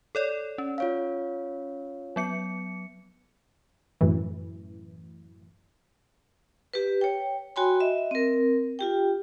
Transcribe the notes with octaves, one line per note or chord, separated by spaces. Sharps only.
A4 C#5 D5
C#4
F4 C#5 F5
F#3 B3 C#7
F#2 A2 E3
G4 B4
C#5 G5
F#4 C#5 G5 G#5 B5 C6
D#5 E5
C4 A#4
F4 G4 G5